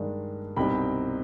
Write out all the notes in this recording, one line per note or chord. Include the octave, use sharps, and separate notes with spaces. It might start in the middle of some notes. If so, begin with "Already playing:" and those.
Already playing: G2 D#3 G#3 D4
C2 B2 G3 C4 D#4 G5 B5